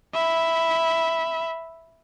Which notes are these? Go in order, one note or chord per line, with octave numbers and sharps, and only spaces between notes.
E5 B5